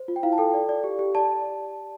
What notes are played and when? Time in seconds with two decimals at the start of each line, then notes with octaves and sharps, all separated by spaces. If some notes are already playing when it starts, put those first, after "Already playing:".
Already playing: C5
0.08 F4
0.16 G5
0.23 E4 F5
0.32 A5
0.38 A4 G5
0.54 D5
0.69 D5
0.84 G4
0.99 G4
1.15 D5 A5